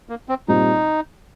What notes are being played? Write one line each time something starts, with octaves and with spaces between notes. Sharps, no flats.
A#3
C4
A#2 G3 C4 D#4